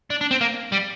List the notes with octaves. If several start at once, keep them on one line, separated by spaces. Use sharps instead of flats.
D4
D4
C4
A#3
G3